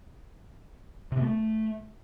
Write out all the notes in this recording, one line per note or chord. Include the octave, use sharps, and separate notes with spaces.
C3
B3
A3